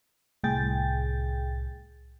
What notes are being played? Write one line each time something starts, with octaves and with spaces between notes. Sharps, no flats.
C2 A2 G#4 G5 A6